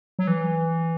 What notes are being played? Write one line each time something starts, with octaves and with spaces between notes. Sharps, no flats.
F#3
E3